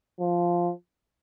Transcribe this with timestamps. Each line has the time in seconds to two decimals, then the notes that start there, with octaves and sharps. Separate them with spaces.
0.20 F3